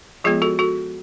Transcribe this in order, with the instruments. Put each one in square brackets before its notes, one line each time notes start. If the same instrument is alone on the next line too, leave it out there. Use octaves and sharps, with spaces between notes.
[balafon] F3 G#3 B3 F4 G#4
F#4 A4
F#4 A4